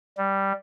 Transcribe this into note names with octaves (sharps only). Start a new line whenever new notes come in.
G3